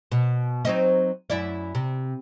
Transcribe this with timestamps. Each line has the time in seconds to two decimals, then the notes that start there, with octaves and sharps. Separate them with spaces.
0.12 B2
0.65 F#3 C4 D#4
1.30 F#2 E4 D5
1.75 C3